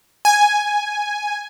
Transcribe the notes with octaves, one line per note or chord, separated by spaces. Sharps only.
G#5